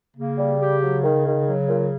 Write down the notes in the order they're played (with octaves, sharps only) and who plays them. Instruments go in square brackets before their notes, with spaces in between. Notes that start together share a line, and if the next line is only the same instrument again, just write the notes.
[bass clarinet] C#3 [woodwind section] A#3
[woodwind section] G3
G4
F#3
D#3
D#3
F#3
A#2